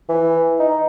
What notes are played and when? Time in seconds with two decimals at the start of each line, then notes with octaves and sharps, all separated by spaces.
0.09 E3
0.59 D#4